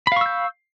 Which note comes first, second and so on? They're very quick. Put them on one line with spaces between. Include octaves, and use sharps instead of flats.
B5 F5 C#6 E6 G6